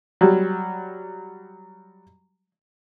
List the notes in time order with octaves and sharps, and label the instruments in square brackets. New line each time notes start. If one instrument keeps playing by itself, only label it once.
[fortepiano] F#3 G3